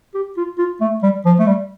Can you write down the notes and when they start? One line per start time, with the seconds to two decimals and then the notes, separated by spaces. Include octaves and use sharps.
0.14 G4
0.37 F4
0.58 F4
0.81 A3
1.03 G3
1.25 F3
1.39 A3
1.47 G3